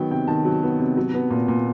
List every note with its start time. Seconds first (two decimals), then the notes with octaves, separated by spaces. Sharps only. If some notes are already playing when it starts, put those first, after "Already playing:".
Already playing: D#3 F#3 B3 G5
0.11 C3 G5
0.27 D#3 A5
0.45 F#3
0.63 B3
0.79 C3
0.97 F#3
1.14 B3
1.31 A#2
1.48 A#2